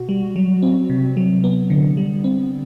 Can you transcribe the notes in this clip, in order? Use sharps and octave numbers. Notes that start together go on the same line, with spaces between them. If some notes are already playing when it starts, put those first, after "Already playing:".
Already playing: B2 F#4
G3
F#3
C4
C3
F#3
B3
D3
G3
C4